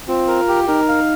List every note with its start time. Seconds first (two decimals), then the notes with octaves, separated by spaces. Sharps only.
0.08 C4 F4
0.28 A#4
0.48 G4
0.68 D#4 A#4
0.88 F5